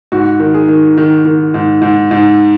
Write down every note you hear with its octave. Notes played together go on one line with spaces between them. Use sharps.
G#2 F#4
D#3
G#4
D#3
D#3
D#3
G#2
G#2
G#2